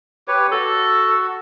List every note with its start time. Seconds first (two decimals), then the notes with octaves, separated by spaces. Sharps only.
0.28 G4 B4 C#5
0.52 F#4 A4